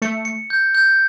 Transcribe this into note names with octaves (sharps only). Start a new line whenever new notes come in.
A3 C#7
C#7
G6
G6